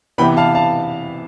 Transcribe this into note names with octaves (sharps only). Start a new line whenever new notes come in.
C3 E3 B3 G5 B5
F5 A5
F5 A5